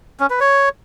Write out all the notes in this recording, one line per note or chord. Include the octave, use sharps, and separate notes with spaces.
C#4
B4
C#5